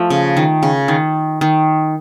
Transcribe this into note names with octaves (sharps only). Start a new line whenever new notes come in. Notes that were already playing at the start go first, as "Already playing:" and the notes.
Already playing: F3 A3
C#3
D#3
C#3
D#3
D#3